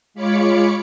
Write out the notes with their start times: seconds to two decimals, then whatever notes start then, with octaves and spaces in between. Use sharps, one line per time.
0.14 G#3 F4 C#5 B5 D6 C#7